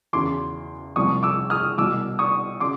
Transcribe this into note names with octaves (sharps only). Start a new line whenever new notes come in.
E2 C#3 E3 C6 D6
C2 C3 F3 C#6 D#6
D6 E6
D#6 F6
C2 B2 D6 E6
C#6 D#6
C#3 C6 D6